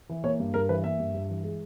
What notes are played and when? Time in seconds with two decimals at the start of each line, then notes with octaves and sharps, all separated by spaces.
0.09 E3
0.24 A#3 C#5
0.40 G2
0.54 G2 A#4
0.69 E3 B4
0.84 A#3 E5
0.99 G2
1.14 G2
1.30 E3
1.44 G#3